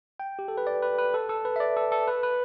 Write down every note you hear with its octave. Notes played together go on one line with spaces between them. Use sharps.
G5
G4
A4
B4
D5
B4
B4
A4
A4
B4
E5
D5
A4
A4
B4
B4